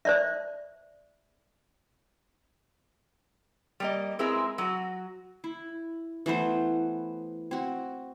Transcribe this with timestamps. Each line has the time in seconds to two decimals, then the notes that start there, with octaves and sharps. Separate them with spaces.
0.05 C5 D5 E5
3.80 G3 A#3 D#5
4.19 G#3 C4 E4 G#4 A#4 B4
4.58 F#3 F#4
5.44 E4
6.26 E3 A3 B3 C5
7.51 C4 F#4